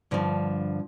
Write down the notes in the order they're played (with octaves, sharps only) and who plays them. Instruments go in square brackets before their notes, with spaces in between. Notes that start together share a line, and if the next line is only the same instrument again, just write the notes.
[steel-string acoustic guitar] G2 D3 F3